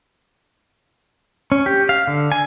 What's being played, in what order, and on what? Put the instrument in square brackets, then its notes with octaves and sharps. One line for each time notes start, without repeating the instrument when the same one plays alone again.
[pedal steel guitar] C#4
G4
F5
D3
G#5